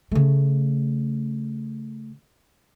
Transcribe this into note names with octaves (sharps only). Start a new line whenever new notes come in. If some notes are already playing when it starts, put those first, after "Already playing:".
C#3 A3